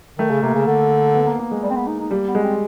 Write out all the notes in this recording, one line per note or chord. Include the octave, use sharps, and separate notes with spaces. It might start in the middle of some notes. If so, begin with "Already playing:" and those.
D#3 A3
C#3
C3 A#3
C#3
D3
B3
A#3
A#3
G#3
G3
C4
B3
D#4
D#4
G3 A#3
B3
G#3
C4